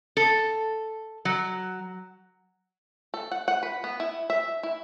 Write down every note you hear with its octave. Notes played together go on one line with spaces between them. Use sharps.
A4
F#3
A4
F#5
F#5
B4
B3
E4
E5
E4